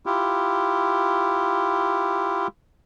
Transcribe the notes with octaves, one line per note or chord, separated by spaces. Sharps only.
E4 F4 G4